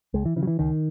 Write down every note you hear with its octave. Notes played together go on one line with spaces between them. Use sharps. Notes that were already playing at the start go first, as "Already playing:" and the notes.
C#2 G#3
E3
C#3 E3
F#3
E3
C#2 D#3